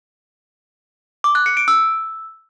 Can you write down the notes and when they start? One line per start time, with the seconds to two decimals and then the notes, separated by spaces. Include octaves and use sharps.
1.24 D6
1.35 F#6
1.46 C#7
1.57 D7
1.68 E6